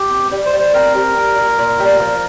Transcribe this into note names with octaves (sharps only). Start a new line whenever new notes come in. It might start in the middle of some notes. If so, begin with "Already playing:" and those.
Already playing: G4
C4
G3
C5
G3
C5
C4 A#4
G3
A#3
A#2
A#2
G3
F3